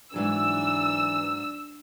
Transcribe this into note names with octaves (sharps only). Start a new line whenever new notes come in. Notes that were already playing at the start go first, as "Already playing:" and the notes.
G#2 E3 F#3 D4 G#5 E6